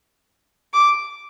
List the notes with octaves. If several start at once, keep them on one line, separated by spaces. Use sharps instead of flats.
D6